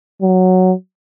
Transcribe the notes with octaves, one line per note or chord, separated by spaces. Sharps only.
F#3